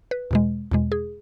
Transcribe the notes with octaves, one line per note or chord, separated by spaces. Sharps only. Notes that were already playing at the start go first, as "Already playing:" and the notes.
B4
E2 B2 G#3
E2 B2 G#3
G#4